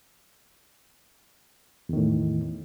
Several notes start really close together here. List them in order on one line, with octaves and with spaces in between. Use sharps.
E2 D#3 A2